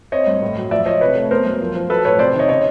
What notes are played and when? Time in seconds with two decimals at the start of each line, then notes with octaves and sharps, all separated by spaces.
0.12 C4 C#5 D#5
0.27 G2
0.42 A2
0.57 F#3
0.71 F3 D5 E5
0.86 F3 C#5 D#5
1.01 C3 B4 C#5
1.16 A3
1.31 B3 A#4 C5
1.46 F#2
1.60 F3
1.75 F3
1.90 F#3 A4 B4
2.05 A2 B4 C#5
2.19 C3 C5 D5
2.35 D#3 C#5 D#5
2.49 C#3 C#5 D#5